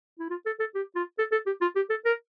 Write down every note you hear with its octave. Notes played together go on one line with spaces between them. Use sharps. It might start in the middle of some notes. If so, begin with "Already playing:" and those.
E4
F4
A4
A4
G4
F4
A4
A4
G4
F4
G4
A4
A#4